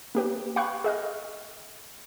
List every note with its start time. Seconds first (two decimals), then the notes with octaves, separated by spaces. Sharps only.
0.15 A#3 G4 B4
0.56 F5 G5 B5 C#6 F#6
0.84 G#4 D#5 F6